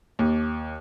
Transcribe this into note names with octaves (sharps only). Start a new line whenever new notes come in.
D#2